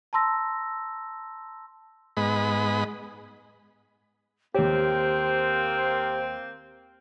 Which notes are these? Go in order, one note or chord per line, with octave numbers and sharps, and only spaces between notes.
A5 A#5 C6 E6 A#6
G#2 G#3 B3 D#5 B5
D#2 A#3 C4 G4 C5 C#5